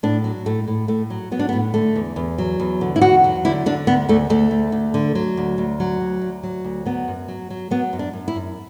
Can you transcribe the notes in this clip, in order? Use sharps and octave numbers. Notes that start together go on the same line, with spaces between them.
A2 D4
F#3
A2 A3
A2
A2 A3
F#3
F#3 B3
D4
B3
A2
D3 A3
E2
E2
F#3
E2
D3
E4
E2 F#4
F#3
D3 E4
D3 D4
D2 B3
D2 A3
D2 A3
D2
D2
D3
F#3
D2
D2
F#3
D2
D2
F#3
D2
F#3 B3
F#2
F#3
F#3
F#3 B3
F#2
D4
F#2
E4
F#2